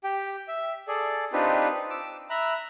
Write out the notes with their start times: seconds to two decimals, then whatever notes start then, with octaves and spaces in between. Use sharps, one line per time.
0.04 G4 G5
0.48 E5
0.88 G#4 A4 D5
1.33 C4 D4 D#4 F4 G4 B4
1.90 D6 E6
2.30 E5 A#5 B5 F#6